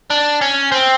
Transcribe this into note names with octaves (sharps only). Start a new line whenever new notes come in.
D4
C#4
C4